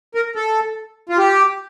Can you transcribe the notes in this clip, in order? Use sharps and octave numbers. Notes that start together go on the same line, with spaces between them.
A#4
A4
F4
G4